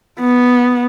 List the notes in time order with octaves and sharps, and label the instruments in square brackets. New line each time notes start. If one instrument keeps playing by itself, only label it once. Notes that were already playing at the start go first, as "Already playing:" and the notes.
[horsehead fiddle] B3